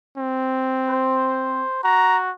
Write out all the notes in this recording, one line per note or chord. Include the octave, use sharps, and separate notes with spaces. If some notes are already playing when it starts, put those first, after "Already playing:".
C4
C5
F#4 A#5